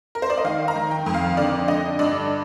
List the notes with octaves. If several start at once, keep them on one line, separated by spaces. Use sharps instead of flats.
A#4
C5
D5
D#5
D#3 F5
A#5
D#3
G5
F2
F5
D3 D5
D3 D#5
G2 D5